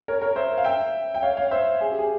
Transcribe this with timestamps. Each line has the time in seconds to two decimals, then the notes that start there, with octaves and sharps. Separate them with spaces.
0.08 A#4 C#5
0.22 A#4 C#5
0.36 C5 E5
0.58 F5
0.65 E5 G5
1.15 G5
1.22 C#5 F5
1.37 C#5 F5
1.51 C5 E5
1.81 G#4
1.92 G4
1.99 G#4